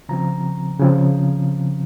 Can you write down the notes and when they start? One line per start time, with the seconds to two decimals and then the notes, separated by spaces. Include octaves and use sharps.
0.09 C#3 F3 C4 A#5
0.79 C#3 F3 C4